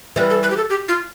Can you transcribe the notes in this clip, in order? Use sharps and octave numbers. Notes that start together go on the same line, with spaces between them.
E3 G3 B4
A4
B4
G4
A4
G4
F4